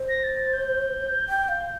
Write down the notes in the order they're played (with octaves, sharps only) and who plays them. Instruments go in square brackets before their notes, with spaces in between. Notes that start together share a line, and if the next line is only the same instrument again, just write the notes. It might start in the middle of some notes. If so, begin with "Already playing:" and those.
Already playing: [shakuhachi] C5
[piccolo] A#6
A6
A6
G6
[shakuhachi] G5
F5